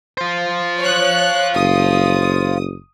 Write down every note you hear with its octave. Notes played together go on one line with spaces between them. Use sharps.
F4 C5
C#5 F#6
F#1 D#6